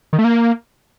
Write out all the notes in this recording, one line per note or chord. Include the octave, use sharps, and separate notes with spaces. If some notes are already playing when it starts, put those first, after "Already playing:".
D#3
A3
A#3